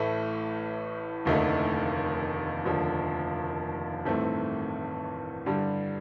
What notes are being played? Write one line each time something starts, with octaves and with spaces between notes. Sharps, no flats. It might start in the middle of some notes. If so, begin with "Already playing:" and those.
Already playing: A1 A2 A3
F1 D#2 D3 A3 D#4
F1 D#2 D3 F3
A1 G2 D#3 A3 C4
G2 D3 G3